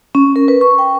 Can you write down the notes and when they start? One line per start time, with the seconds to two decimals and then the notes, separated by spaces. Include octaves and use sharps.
0.15 C#4
0.36 A#4
0.48 B4
0.61 C#6
0.79 G5